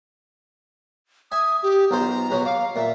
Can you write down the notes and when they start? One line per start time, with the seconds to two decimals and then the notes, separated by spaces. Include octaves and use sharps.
1.32 E5 G#5 D#6
1.63 G4
1.91 B1 F4 C5 A#5
2.31 B2 F#3
2.45 F5 D6
2.76 A#2 E5